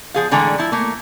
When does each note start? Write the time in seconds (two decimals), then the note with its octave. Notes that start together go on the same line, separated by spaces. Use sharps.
0.14 F3 G#4 F5
0.31 A2 D3 E3 G#3 G#4 A#5
0.58 F3 E4
0.72 A3 A#3